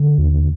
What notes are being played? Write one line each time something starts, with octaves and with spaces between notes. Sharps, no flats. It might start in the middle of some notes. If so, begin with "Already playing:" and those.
Already playing: D3
D#2